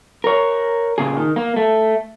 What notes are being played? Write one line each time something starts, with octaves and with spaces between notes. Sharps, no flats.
A#4 C#5
A#2 C#3 G#4
D#3
A#3
A3